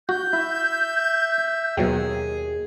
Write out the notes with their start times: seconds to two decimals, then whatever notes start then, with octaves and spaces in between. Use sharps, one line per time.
0.09 F#4 G6
0.33 E4 E5
1.77 D#2 B2 F#3 G#4 G5